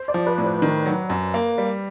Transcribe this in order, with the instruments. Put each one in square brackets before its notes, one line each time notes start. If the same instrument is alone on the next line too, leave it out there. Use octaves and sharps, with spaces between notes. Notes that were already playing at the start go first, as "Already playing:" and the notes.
Already playing: [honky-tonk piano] C5
D5
[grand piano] F3
[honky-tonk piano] B4
[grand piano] A2
[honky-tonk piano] C5
[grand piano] D#3
F#3
F#2
A#3
G3